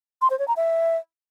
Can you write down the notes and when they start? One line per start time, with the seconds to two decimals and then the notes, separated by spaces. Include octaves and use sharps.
0.22 C6
0.30 C5
0.39 C#5
0.48 A#5
0.56 E5